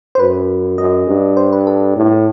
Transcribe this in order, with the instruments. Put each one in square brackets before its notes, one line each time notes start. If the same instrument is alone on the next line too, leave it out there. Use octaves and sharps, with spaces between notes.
[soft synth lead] C5
[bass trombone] F#2 [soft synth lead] B4
[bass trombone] F#2 [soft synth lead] D#5
[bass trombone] G2
[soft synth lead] C5
B4
A4
[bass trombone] A2